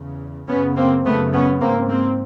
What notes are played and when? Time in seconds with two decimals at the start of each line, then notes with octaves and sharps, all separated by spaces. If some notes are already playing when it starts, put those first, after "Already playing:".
Already playing: E2 C#3
0.48 F#2 C#3 B3 C#4
0.76 A#3 C4
1.05 F#2 C#3 A3 B3
1.33 B3 C#4
1.61 G#2 A#3 C4
1.89 A#3 C4